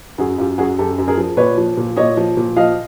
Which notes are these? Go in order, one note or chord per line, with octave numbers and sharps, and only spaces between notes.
F#2 F#4 G#4
F#2 F4 G4
F#2 F#4 G#4
F#2 G4 A4
F#2
G#4 A#4
F3
A#2 B4 C#5
F3
A#2
A#2 C#5 D#5
F3
A#2
F3 D#5 F5